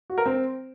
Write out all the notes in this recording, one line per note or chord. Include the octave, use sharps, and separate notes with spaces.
F#4
A#4
C4